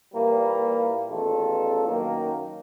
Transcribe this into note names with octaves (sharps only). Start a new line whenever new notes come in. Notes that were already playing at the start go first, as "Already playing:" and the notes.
A#2 E3 G3 A#3
A1 E2 D#3 F4 A4
F#2 D#3 A#3